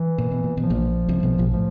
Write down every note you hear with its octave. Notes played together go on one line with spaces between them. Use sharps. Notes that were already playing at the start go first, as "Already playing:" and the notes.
Already playing: E3
A#2
B2
A#2
B2
F3
A#1 A#2
C2 C3
B1 B2
A#1 A#2
A2 F3